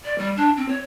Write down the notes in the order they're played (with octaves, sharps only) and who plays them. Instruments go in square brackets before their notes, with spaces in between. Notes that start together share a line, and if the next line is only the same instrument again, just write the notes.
[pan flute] D5
G3
D4
C4
C#5